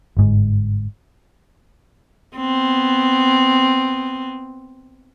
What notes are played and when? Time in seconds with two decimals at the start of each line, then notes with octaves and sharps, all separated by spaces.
0.17 G1 G#2
2.36 B3 C4